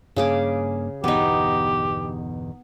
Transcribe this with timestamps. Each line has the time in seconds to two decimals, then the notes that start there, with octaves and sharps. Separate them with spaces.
0.16 G2 C#3 A#3 G#4 D6
1.04 G1 E2 B2 B3 D#4 G4